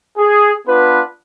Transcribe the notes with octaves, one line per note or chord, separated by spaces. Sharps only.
G#4
B3 D4 F4 B4